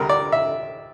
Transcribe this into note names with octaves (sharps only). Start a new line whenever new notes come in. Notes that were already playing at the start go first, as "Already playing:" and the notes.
Already playing: D2 C3 G3 A#4
D5
E5